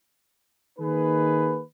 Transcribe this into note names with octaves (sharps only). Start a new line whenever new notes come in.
D#3 A#3 D#4 G#4 B4